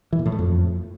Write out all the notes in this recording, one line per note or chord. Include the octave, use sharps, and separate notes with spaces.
E3
A#2
A2
A3
F2